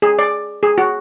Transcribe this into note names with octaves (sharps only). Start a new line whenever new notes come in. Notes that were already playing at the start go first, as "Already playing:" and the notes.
G#4
D5
G#4
F#4